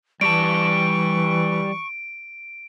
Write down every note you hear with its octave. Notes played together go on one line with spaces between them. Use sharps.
E3 G3 G4 A5 C#6 D7